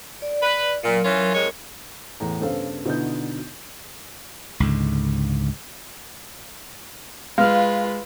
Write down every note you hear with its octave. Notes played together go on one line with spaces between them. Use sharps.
D5
B4
A#2 F#3 A#4
E3 C#4 F4
F2 G#3 A#4 C#5
E2 A2 A#5
G2 C#3 B3 A4 C5 F5
B2 D3 B3 D#4 E4 G6
C#2 G#2 D3
G#3 F4 B4 F5 F6